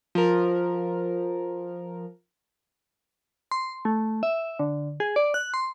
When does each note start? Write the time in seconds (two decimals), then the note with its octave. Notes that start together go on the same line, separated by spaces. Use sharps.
0.15 F3 A#4
3.51 C6
3.85 A3
4.23 E5
4.60 D3
5.00 G#4
5.16 D5
5.34 F#6
5.54 C6